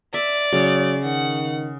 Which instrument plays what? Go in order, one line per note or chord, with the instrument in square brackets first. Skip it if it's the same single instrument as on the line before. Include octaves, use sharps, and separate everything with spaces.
[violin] D5 [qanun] E5
[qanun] C#3 [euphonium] F#3
[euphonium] D#3 [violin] F#5